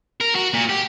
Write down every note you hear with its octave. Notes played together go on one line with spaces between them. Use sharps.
A#4
F#4
A#2
G4